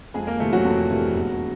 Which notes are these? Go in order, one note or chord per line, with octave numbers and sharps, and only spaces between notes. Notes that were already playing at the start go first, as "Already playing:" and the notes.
F2 G#3 G#4
A#3 A#4
C3 E3 G3 A3 A4
F#3 F#4
F2
C3 E3 G3
E1